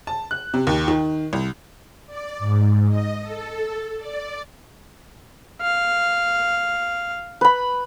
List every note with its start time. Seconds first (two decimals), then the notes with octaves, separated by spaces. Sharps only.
0.07 A5
0.31 F#6
0.54 C3
0.67 D#2
0.88 D#3
1.33 C2
2.06 D5
2.39 G#2
2.89 D#5
3.21 A4
3.98 D5
5.62 F5
7.41 B4 B5